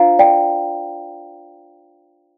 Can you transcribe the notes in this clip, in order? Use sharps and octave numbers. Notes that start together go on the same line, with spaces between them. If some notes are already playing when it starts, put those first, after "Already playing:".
Already playing: D4 F4 C5 F5 A#5
D5 G5